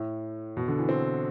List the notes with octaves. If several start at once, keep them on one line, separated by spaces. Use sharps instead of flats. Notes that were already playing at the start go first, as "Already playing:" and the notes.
Already playing: A2
B2
D3
E3
C4